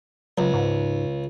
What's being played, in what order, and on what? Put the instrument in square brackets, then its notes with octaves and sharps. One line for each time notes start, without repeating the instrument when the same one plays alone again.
[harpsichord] C#2 [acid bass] F#3
[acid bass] G#2